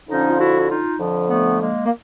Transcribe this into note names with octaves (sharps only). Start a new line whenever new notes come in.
F2 D3 F3 C#4 D#4
F4
E4 F#4
E4
D#4 F4
F2 D3 F3
A3 B3
G#3 A#3
A#3